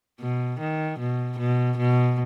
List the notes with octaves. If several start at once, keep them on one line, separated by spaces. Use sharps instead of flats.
B2
D#3
B2
B2
B2